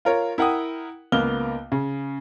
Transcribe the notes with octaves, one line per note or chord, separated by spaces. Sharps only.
F4 A#4 C#5
E4 A#4 F#5 G5 D#6
C#2 A#3 B3 F6 G7
C#3